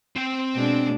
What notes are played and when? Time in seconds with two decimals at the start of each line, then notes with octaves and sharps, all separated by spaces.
0.16 C4 G5
0.55 B2 G#3 D4